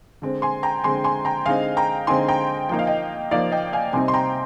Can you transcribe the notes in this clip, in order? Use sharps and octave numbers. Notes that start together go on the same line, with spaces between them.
D3 G#3 C4
G#5 C6
G5 A#5
D3 G#3 C4 G#5 C6
G#5 C6
G5 A#5
D3 G#3 C4 D#4 F5 G#5
G5 A#5
D3 G#3 C4 D#4 G#5 C6
G5 A#5
F3 A#3 D#4 G5
F5
D#5 G5
F3 A#3 D#4 D5 F5
D#5 G5
F5 G#5
C3 G3 C4 D#4 G#5 C6
C6
G5 A#5